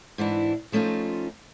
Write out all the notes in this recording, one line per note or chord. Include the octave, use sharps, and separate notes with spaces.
G#2 E3 D4 E4
F3 A3 C#4 D#4 F4